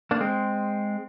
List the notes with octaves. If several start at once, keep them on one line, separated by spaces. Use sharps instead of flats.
A#3 D4
G#3 C4